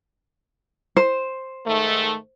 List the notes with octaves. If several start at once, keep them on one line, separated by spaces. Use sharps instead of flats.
C5
G#2 D#3 A3